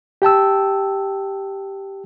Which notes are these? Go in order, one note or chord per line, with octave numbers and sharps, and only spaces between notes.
G4 G5 A5 E6